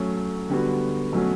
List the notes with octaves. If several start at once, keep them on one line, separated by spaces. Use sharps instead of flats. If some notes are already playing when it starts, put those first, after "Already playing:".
Already playing: F#3 A3 C#4
D3 G3 B3 F#4
B2 F#3 A3 C#4 F#4